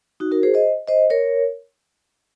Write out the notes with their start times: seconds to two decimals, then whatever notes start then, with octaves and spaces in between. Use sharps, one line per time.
0.20 D#4 F#4
0.32 F#4 A#4
0.43 G#4 C5
0.54 C5 D#5
0.88 C5 D#5
1.10 A#4 C#5